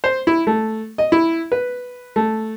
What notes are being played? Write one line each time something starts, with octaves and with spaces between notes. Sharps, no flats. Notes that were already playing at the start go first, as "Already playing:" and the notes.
C5
E4
A3
D#5
E4
B4
A3